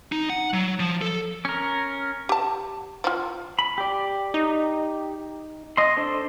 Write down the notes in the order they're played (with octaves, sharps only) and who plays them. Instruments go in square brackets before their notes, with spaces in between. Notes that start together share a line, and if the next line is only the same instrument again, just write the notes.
[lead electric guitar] D#4
F#5
F#3
F3
A4
[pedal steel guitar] C#4 A#4
[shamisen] G4 A5
F3 F4
[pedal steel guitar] B5
G4 D5
[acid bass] D#4
[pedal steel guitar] D#5 C6
D4 A4 C5